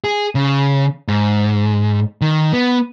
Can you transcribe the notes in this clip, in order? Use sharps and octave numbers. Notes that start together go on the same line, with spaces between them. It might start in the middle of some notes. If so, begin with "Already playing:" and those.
G#4
C#3
G#2
D#3
B3